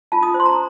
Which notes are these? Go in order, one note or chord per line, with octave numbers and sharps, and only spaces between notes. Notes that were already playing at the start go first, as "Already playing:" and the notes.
F4 A5
D#6
C5
C6
A#5